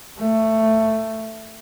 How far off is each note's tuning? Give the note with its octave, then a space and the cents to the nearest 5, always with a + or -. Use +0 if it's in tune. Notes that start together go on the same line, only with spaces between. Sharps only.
A3 +10